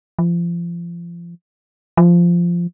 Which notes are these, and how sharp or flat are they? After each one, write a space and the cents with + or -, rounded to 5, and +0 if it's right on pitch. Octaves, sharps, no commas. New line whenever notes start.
F3 -30
F3 -10